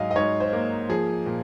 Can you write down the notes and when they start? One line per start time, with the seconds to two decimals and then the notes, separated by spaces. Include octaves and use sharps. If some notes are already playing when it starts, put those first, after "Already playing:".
Already playing: G#2 F#3 D#5 F5 G#5
0.11 D#5
0.16 G#2 C#5
0.40 C5
0.53 A#3
0.89 F3 G#4
1.26 A#2